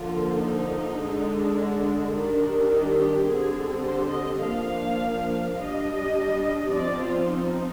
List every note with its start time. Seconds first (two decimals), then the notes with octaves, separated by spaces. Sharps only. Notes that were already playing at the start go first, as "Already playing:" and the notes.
Already playing: D3 F3 A#3 F4
0.39 D#4
0.97 D3 G#3 D4
2.12 D#3 G3 D4
2.69 D#4
2.98 G4
3.26 D3 G3 C4 G#4
3.83 C5
4.12 D#5
4.41 F3 A#3 D4 F5
5.57 G3 D4 D#5
6.71 F3 C4 D5
6.99 F4
7.28 D#4